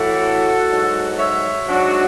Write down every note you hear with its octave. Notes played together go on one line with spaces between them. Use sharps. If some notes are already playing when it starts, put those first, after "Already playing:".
Already playing: A2 E3 F#4 A4
G#2 F#3
C#5 E5
G#2 F#3 D4 F#4